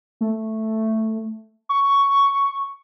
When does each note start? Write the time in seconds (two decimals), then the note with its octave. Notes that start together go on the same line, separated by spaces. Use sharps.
0.21 A3
1.69 C#6